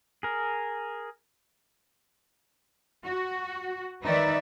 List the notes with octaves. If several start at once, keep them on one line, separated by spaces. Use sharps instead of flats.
G#4 A#4
F#4
D#3 D#4 B4 D5 E5